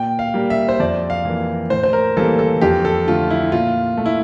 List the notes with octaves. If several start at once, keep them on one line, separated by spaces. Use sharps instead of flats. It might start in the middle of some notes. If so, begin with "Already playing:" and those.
Already playing: A#2 G5
F5
G3 A#3
E5
C5
F2 D5
F5
E3 A#3
A2 C5
C5
A#4
E3 G3 A#3 A4
A4
F2 G4
A4
D3 A3 F4
E4
A#2 F4
A3
E4